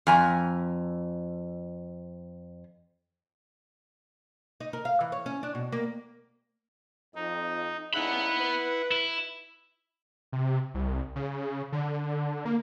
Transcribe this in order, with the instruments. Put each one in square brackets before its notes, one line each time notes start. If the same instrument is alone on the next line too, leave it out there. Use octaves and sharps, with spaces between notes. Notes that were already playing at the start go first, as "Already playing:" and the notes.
[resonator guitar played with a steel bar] F2 G#5 A#5
[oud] D#4
A#4
F5
E3
C#5
C#4
D4
B2
A#3
[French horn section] F2 [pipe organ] D#4
[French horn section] G2 C#3 D#4 [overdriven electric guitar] B3 B5 [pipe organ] E4 F#5
[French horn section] B4
[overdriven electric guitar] E4
[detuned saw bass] C3
C2
C#3
D3
A#3